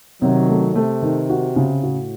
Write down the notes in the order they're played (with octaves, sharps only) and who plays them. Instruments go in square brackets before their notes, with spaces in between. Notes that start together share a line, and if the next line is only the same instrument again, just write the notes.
[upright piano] C3 [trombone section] D#3 F#3
[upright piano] A3
[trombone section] C3 [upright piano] A3
[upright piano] D#3
F#4
C#3
[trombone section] A2 [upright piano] F#4